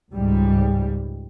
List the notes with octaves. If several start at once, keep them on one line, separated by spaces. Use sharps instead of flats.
C#2 G#2 G3